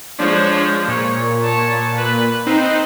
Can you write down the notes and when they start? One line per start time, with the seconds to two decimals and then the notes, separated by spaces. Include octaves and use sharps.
0.19 F3 G#3 D4 C#5
0.88 A#2 C#5
1.44 C#5 A5
1.97 B4
2.46 C4 D#4 B4 C5